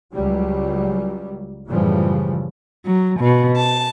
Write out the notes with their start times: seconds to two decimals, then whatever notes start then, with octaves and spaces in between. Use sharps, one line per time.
0.15 C#2 F#3 G3
1.69 F#2 A2 C#3 E3 F3 G3
2.84 F#3
3.18 B2
3.59 A5